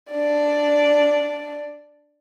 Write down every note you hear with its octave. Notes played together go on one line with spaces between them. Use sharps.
D4 D5